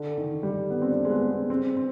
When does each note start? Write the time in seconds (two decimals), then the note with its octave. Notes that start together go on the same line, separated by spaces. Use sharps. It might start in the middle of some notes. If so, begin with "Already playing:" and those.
Already playing: D3
0.17 D#3
0.43 G3
0.70 B3
0.82 C4
0.90 D4
1.05 G#3
1.10 B3
1.30 B3
1.50 C4
1.77 C4